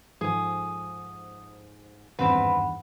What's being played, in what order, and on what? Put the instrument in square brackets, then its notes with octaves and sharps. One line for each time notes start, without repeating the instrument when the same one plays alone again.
[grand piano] G#2 F3 A4 [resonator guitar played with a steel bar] G#4 [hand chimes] D#6
[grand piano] G#1 E2 G2 [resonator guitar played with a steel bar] C4 B4 [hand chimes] F#5 B5